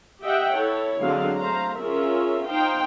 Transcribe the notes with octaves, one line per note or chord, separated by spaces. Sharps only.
G4 D#5 E5 F#5 G5
E4 A4 C#5
D3 F#3 G#3 C4 F5
A3 C5 F5 A#5
C#4 F4 G#4 A#4 E5
D#4 C5 F5 G5